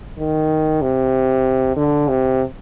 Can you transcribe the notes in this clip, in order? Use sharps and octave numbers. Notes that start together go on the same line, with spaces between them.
D#3
C3
D3
C3